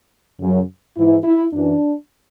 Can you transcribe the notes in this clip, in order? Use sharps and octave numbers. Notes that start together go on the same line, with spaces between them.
F#2 C#3 F#3
G#2 E3 E4
E4
F#2 E3 D4